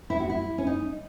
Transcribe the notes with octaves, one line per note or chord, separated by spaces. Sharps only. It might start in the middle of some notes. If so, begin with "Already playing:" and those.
E4
F#4
E4
C#4
D#4